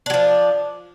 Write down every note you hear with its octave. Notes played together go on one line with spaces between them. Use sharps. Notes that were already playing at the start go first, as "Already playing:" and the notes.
F3 F#3 D4